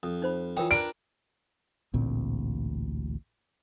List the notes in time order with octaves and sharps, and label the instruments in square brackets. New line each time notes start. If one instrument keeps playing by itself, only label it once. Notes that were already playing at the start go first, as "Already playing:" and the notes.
[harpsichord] F2 [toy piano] D#6
[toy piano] D#4 C5 B5
[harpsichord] E3 C#5 D#6 [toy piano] F4 A#4 G5
[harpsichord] D4 A#4 B4 [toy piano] D5 [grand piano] D7
[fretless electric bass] A1 D2 A#2 C4